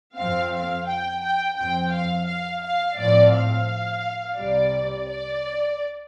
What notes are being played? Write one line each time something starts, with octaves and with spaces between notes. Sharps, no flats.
F2 F3 C4 F5
F5
G5
G5
F2 F3 C4 G5
F5
F5
F5
A2 F3 C4 D5
F5
C2 C3 G3 D5
D5